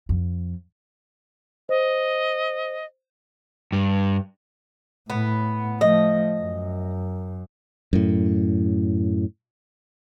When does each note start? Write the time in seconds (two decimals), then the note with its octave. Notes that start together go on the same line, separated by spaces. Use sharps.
0.09 F2
1.69 C5 D#5
3.72 G2
5.10 A2 B3
5.81 F3 A3 D#5
6.41 F#2
7.93 F#2 A2